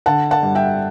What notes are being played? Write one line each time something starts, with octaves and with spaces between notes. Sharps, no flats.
D3 F#5 A5
F#5 A5
G2
E5 G5